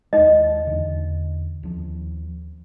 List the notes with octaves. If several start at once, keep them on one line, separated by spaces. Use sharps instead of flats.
D#2 G#3 D#4 D#5
E2 D3
D#2 F3